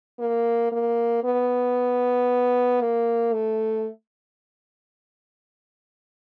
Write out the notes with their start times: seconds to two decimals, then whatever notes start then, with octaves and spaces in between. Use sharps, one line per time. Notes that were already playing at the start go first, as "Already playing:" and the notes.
0.19 A#3
0.72 A#3
1.24 B3
2.81 A#3
3.33 A3